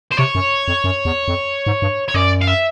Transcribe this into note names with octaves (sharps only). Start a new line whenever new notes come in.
C5
C3 C#5
F#2
F2
F#2
E2
F2
G#2
G2
C#5
F#2 D5
F5
E5